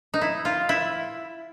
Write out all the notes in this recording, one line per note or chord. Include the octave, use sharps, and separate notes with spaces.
D#4
E4
F4
E4